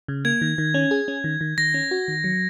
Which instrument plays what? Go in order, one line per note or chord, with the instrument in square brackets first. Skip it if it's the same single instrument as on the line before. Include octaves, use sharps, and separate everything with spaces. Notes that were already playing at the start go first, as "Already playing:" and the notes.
[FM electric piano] C#3
[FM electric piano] A#3 [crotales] G#6
[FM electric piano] D#3
D#3
C#4
G#4
C#4
D#3
D#3
[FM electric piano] D#3 [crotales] A#6
[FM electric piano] C#4
F#4
D#3
F#3